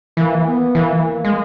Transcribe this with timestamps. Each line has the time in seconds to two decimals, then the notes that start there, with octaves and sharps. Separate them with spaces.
0.17 E3 A#3
0.46 B3
0.75 E3 A#3
1.04 A#3
1.25 G#3